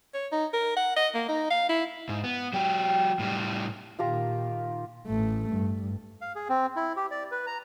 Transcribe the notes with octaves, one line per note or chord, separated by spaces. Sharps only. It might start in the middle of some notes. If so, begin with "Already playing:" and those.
C#5
D#4
A#4
F#5
D#5
A#3
D#4
F5
E4
G#2
B3
F#3 G4
A2 G3
A#2 D#3 F4 G4 A#5
A1 A3
G2
F5
G#4
C4
E4
G4
D5
B4
A#5